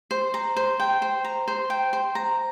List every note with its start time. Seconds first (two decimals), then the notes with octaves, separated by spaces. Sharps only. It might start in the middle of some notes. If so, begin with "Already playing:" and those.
0.11 C5
0.34 A#5
0.56 C5
0.80 G5
1.02 C5
1.25 A#5
1.48 C5
1.70 G5
1.93 C5
2.15 A#5